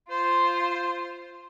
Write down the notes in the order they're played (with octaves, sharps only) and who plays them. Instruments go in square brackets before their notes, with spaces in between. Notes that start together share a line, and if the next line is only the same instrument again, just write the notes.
[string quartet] F4 [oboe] C5